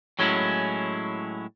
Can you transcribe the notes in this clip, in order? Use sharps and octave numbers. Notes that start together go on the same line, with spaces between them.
A2 F#3 G#3 C#4 E4